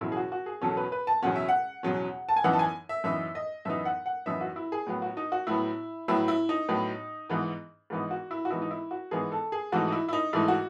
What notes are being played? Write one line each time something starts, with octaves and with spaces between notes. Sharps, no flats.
E2 B2 F#3 C#4 E4
G#4
F#4
F#4
G#4
E2 B2 F#3 C#4 A4
B4
B4
A5
E2 B2 F#3 C#4 F#5
E5
F#5
E2 B2 F#3 C#4
A5
G#5
F#2 E3 B3 D#4 F#5
A5
G#5
E5
F#2 E3 B3 D#4 E5
D#5
F#2 E3 B3 D#4 E5
F#5
F#5
F#2 E3 B3 D#4 E5
F#4
E4
G#4
A2 F#3 B3
F#4
D#4
F#4
A2 F#3 B3 E4
A2 F#3 B3 E4
E4
D#4
A2 F#3 B3
G#2 E3 B3 D#4
G#2 E3 B3 D#4
F#4
E4
F#4
G#2 E3 B3 D#4 E4
D#4
E4
F#4
G#2 E3 B3 D#4 G#4
A4
G#4
G#2 E3 A3 D#4 F#4
D#4
E4
E4
D#4
G#2 E3 A3 D#4 E4
F#4